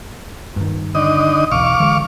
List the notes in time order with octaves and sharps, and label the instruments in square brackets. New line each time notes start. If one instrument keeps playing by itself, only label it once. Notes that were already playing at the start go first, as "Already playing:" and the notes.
[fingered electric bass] G2 D#3
[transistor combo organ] D3 D#4 D#5
[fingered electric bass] B1 E2 [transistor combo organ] F5 C#6 D6
[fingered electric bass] D3 E3 G#3